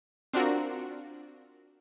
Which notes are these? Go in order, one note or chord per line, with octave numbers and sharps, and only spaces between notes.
C4 D4 F4 F#4 A#4